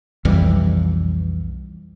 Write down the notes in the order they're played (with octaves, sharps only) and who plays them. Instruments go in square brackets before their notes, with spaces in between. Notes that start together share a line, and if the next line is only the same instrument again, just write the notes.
[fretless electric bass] B1 F2 E3 G3